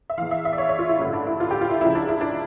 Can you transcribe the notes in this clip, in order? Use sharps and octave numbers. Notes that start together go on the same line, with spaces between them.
E5
E2 E3 F5
E5
E5
D5
C#5
C#5
F4
E4
A1 G2 D3 E4
D4
E4
F4
G4
F4
E4
C#2 C#3 F3 E4
D4
E4
D4